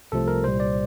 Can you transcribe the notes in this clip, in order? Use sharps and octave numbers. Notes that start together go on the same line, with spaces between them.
C2 C3 F3 A3 A4
A#4
C2 A#2 G3 C5
D5